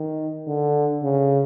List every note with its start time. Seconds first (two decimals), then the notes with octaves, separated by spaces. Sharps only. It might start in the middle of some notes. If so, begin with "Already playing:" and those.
Already playing: D#3
0.47 D3
1.03 C#3